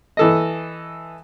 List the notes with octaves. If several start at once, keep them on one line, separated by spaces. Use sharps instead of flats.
E3 A4 D#5